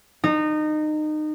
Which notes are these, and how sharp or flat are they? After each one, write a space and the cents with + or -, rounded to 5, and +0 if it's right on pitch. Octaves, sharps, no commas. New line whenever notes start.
D#4 -25